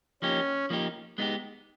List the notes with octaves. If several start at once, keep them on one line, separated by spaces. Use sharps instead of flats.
F3 A#3 C#4 D#4 G4
F3 A#3 D#4 G4
G#3 B3 D#4 G4